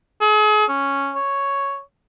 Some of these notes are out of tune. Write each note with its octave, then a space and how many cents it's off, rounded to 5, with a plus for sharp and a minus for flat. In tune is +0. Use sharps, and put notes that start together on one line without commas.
G#4 +40
C#4 +0
C#5 +0